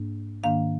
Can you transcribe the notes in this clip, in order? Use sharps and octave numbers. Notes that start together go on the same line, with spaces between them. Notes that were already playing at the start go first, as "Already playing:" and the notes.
Already playing: G#2 A#3 D4
G#2 D#3 A#3 D4 F5